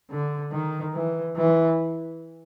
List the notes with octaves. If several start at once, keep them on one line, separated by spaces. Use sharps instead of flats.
D3
D#3
E3
E3